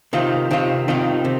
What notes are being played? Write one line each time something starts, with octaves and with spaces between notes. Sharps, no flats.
C3 D#3 C4 F4
C3 D#3 C4 F4
C3 D#3 C4 F4
C3